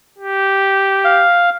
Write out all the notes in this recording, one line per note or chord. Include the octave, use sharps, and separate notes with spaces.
G4
F5